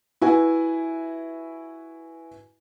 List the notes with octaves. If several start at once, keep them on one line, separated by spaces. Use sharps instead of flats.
E4 F#4 B4 E5 G#5